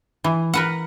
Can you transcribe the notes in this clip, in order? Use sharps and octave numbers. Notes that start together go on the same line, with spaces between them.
E3
A#4 B4 F#5